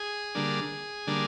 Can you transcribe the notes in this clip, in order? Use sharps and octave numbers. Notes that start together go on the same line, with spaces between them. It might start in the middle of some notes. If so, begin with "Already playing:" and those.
Already playing: G#4
D3 G3 A#3 D4
D3 G3 A#3 D4